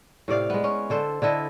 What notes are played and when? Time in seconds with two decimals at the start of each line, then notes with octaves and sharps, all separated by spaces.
0.28 A2 C3 D5 F5
0.50 G#3 B3
0.64 C#4
0.90 D3 A4 C5
1.22 D3 E4 A4 D#5